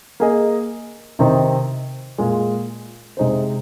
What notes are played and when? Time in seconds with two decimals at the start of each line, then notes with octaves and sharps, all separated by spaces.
0.20 A#3 G#4 D#5
1.19 C3 D#3 C4 D#4
2.18 A#2 G#3 F4
3.17 C3 G#3 D#4 C5